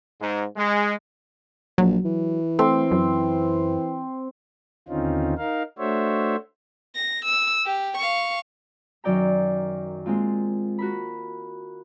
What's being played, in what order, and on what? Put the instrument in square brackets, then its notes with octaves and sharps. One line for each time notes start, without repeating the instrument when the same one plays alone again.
[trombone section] G#2
G#3
[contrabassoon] A#1 [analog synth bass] F#3
[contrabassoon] E3
[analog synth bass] A3 [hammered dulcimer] C4
[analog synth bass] F#2
[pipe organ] D#2 D3 C4 C#4 D#4 F4
D#4 A#4 F5
A3 D4 F#4 C5 C#5 E5
[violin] A#6
E6
G4
F5 C#6
[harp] F#2 D#3 F#3 D5 G5 A#5
G#3 A#3 C4 F4
F#4 A#4 B5